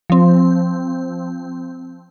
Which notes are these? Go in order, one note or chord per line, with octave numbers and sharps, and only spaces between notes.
F3 C4